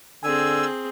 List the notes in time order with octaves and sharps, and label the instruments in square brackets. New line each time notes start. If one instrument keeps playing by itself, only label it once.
[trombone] D3 [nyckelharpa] C4 G#4 [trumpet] G#5 [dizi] E6